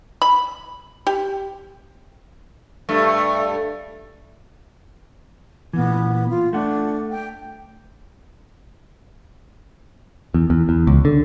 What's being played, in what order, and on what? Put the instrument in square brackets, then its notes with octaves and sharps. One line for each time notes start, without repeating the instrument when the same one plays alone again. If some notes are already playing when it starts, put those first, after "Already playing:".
[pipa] B5
G4
[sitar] G2 A3
[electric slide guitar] A#2 E3 [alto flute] B3
[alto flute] F4
[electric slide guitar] A3 F#5 [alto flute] D4
[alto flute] G5
[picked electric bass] E2
E2
E2
C#2
D3